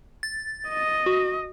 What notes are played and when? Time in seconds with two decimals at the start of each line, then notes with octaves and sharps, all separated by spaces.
0.23 A6
0.68 D#5
1.06 F#4